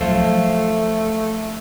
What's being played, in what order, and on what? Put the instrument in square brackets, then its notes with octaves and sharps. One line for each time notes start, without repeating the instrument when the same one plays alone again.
[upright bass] F3 F#3 [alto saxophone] A3 [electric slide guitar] A4 C5 F5